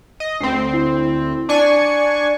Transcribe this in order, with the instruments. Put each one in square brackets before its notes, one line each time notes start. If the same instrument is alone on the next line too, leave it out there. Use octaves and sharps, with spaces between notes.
[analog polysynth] D#5
[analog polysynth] D2 C4 [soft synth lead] C7
[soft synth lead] E4
[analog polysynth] D4 G#5 C#6 [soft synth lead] D5